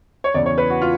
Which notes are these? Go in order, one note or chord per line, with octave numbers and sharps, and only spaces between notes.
C#5
E2 C#3 E3 D5
C#5
B4
F#4
F4